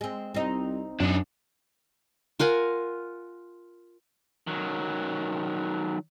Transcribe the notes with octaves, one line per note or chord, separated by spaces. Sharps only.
G#3 C4
C2 C4 D#4
F#2 D4 D#4
F4 A#4 F#5 G#5
D#3 F#3